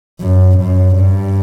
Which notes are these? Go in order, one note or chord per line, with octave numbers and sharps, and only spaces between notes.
F#2
F#2
G2